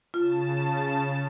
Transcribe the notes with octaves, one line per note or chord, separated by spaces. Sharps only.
C#3 F4 A5 E7